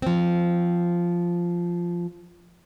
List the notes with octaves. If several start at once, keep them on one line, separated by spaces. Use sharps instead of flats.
F3 C4